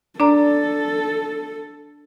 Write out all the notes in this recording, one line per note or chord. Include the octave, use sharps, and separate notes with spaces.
D4 A4 D5 A#5